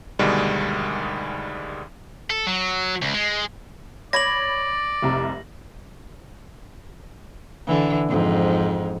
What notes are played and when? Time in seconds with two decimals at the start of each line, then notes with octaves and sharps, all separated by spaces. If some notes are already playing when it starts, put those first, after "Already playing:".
0.19 D2 B2 D#3 G3 G#3
2.30 A4
2.47 F#3
3.02 C#2
3.14 G#3
4.13 C#5 D5 B5 G#6 A#6 F#7
5.02 F1 C2 A#5
7.67 D3 E3
8.08 F2 G#2